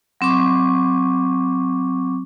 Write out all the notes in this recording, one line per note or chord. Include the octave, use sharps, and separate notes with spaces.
F#3 C4 C#6 D6